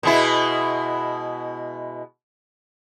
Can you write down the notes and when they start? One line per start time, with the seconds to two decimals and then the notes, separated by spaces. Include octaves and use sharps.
0.03 B2 G#3 E4